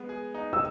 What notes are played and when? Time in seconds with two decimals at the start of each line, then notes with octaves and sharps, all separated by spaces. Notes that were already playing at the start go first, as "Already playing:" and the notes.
Already playing: G#3 B3
0.09 G#4
0.34 D#4
0.53 E6